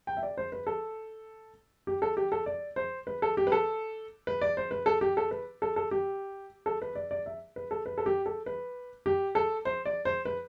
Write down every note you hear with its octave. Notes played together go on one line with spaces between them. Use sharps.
G5
E5
D5
C5
B4
A4
G4
A4
G4
A4
D5
C5
B4
A4
G4
B4
A4
B4
D5
C5
B4
A4
G4
A4
B4
A4
A4
G4
A4
B4
D5
D5
E5
B4
A4
B4
A4
G4
A4
B4
G4
A4
C5
D5
C5
B4